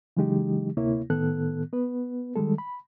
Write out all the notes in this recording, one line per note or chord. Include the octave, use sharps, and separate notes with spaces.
C#3 E3 F#3 G#3 D#4 G4
D2 C3 A#3 E4 C#5
A2 D#3 B3 A4 F#6
B3 B4
D#3 G3 G#3 A4
B5